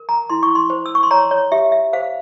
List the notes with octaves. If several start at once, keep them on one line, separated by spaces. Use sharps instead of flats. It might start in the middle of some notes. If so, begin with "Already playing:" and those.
Already playing: A#4
A#5
E4 C6
C#6
C6
C5
E6
C#6
C6
C#5 A#5
C#5
G4 E5
E5
C5 F5